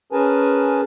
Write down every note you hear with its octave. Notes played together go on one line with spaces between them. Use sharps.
C#4 G#4 A#4 B4 G#5 A5